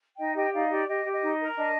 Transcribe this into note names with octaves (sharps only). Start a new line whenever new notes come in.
D#4 D#5 G5
G4 D#5 G5
D#4 D5 F5
G4 D5
G4 D#5
G4
D#5
D#4
A#4
D4 D#5